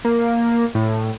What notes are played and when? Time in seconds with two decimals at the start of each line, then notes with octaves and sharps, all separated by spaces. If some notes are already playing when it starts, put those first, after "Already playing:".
0.05 A#3
0.75 A2